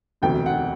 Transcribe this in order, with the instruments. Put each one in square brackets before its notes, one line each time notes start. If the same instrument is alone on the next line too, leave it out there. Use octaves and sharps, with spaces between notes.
[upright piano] E1 D2 C3 G5
F#5